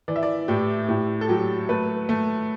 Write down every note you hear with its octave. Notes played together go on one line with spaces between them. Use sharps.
E3 D5
E5
D5
A2 G4
A2 G4
A4
F#3 G4
A3 B4
A3